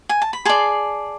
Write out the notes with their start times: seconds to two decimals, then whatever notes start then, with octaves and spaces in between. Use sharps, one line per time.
0.09 G#5
0.22 A5
0.33 B5
0.45 G#4 D5 A5 C6